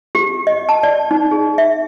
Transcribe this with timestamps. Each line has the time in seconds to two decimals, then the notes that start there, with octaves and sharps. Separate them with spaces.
0.15 G4
0.47 D#5
0.69 A5
0.83 D5
1.11 D#4
1.31 G#4
1.58 E5